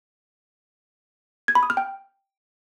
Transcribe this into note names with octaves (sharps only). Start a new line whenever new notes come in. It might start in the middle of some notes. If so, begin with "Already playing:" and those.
G#6
B5
D#6
F6
G5